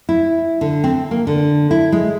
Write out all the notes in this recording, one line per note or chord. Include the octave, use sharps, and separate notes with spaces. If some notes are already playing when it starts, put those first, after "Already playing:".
E4
D3
C4
A#3
D3
E4
G#3